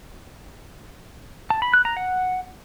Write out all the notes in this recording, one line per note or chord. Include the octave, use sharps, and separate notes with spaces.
A5
B5
F#6
A#5
F#5